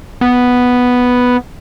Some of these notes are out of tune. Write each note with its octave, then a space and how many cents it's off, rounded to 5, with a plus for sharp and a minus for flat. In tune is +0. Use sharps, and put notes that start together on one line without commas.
B3 +0